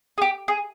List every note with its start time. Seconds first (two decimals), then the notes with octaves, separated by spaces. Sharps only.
0.18 G#4
0.22 G4
0.48 G#4